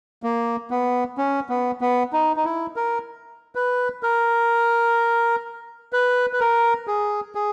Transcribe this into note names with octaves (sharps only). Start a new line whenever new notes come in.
A#3
B3
C#4
B3
B3
D#4
D#4
E4
A#4
B4
A#4
B4
B4
A#4
G#4
G#4